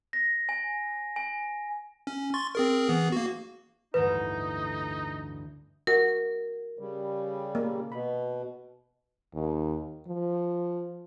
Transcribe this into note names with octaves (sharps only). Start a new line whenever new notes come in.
A#6
G#5
G#5
C#4
C6 C#6 A6
C4 G#4 A#4
E3 B3 G#4
A#3 F#4
A1 D2 G2 D#4 B4
F#4 A#4
C#3 G3
A#3
B2 B5
D#2
F3